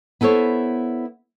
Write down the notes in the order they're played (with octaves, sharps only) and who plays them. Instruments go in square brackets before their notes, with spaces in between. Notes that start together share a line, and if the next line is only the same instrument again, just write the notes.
[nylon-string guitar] B3 E4 A4 C5 C#5